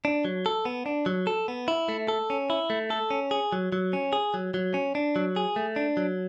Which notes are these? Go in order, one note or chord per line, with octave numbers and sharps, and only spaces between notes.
D4
F#3
A4
B3
D4
F#3
A4
B3
E4
A3
A4
C#4
E4
A3
A4
C#4
G#4
F#3
F#3
C#4
G#4
F#3
F#3
C#4
D4
F#3
G#4
A3
D4
F#3